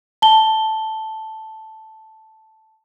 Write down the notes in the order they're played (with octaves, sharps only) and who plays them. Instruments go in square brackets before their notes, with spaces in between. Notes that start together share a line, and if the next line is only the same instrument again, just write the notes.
[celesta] A5 G7